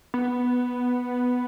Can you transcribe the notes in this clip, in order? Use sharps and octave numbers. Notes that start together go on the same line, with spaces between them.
B3